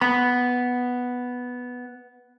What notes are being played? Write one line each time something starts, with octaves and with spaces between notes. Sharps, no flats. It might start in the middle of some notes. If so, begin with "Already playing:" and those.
B3 B5